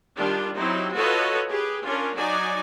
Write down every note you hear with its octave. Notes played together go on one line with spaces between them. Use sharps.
D#3 G3 D4 F4 G4
F#3 C4 D#4 E4 G4 C5
F4 F#4 A4 B4 C#5 D#5
G4 G#4 B4
C#4 D4 F4 A#4
F#3 D#4 F#4 D5 G#5